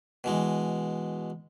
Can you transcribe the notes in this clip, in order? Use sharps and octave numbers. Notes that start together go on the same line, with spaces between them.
B2 E3 G#3